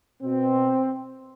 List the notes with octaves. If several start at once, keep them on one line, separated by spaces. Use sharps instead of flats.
B2 C4